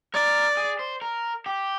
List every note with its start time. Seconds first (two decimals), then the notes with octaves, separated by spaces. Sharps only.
0.14 A#4 D5
0.57 G#4
0.79 C5
1.02 A#4
1.46 G4